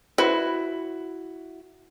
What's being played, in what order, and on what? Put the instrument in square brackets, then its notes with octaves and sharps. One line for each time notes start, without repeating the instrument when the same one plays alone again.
[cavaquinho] E4 F#4 [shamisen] B4 C5